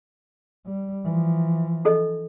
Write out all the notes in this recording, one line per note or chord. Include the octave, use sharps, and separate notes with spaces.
G3
E3 F3
D#4 A4 D#5